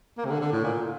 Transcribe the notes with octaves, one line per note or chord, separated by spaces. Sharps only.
A#3
C3
D3
D3
A2
A#2